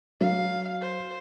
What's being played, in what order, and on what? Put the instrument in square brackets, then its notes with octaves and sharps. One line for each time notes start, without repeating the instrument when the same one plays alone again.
[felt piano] F#3 [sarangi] F5
[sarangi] C5